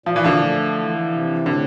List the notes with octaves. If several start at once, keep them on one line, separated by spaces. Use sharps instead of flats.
A#2 F3
E3
D3 F3
A3
E3
C3
A2 D3